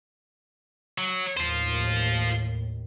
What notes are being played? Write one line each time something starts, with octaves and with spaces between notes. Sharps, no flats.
F#3
D#2 A2 F4 C5